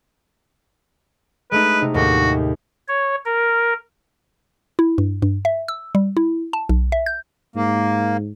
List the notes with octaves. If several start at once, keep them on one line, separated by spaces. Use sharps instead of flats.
G#3 A3 D#4 B4
C3 D#4
D#2 A2 F#4 G4
C#5
A#4
E4
G2
G2
E5
E6
G3
E4
A5
B1
E5
G6
G#2 A#3